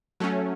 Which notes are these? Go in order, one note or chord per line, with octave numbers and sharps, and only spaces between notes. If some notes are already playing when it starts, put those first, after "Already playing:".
F#3 A3 C#4